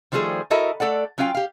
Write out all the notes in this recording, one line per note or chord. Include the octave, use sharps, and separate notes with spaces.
D#3 F3 G3 A3 G#4 C5
E4 F#4 A4 A#4 D#5 E5
A3 A4 D5 F#5
F#3 C#4 F4 F5 G5
G4 F5